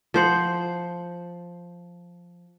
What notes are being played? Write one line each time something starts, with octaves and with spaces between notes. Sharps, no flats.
F3 C5 F#5